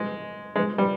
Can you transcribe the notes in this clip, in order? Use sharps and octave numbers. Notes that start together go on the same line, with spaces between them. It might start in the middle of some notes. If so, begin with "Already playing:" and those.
Already playing: G#3
G#3
G3